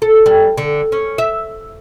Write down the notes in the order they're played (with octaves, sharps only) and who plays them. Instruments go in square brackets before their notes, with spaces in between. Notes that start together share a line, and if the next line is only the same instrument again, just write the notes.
[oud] A4
G3
D3
C#4
E5